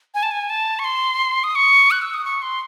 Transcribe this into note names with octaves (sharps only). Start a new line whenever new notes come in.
G#5
A5
G#5
A5
C#6
C6
D#6
C#6
F#6
E6
D#6
C#6
C6